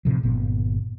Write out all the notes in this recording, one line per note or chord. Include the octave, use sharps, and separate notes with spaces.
A2 C3 F3
G1 A#2 B3